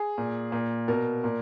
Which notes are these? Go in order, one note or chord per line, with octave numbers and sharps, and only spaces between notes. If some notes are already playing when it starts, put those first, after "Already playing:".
Already playing: G#4
A#2
A#2
B2 A#4
A#2